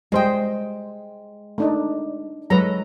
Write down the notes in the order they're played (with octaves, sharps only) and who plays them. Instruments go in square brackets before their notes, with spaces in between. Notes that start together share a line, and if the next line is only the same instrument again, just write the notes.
[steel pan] G3 C5 D#5 [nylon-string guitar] G#3 G5
[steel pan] A3 D4 D#4
[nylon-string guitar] F#3 A4 [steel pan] G#3 B4 A#5